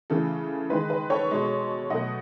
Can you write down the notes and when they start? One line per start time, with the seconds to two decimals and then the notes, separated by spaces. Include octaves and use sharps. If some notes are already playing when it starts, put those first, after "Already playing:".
0.10 C#3 E3 A3 A4
0.70 D#3 G#3 B4
0.90 B4
1.10 A4 C#5
1.31 B2 G#3
1.90 B2 F#3 A3 D#5 F#5